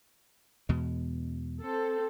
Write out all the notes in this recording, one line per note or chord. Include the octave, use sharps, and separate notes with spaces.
E2 B2 G#3
C4 A4